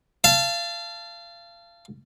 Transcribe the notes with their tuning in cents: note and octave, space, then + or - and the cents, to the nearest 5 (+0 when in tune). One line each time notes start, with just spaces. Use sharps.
F5 -30 A5 +0